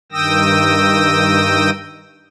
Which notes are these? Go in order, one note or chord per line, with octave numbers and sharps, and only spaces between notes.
G2 D#3 G5 D#6 E6 A#6